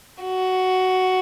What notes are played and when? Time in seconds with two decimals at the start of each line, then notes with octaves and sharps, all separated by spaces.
0.23 F#4